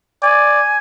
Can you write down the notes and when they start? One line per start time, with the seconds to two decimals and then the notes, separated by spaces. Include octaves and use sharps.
0.23 D5 G#5